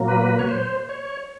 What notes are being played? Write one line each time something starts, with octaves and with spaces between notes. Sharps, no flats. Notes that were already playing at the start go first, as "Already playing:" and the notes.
Already playing: A#2 F#3 A#3
B4
C#5
C5
C#5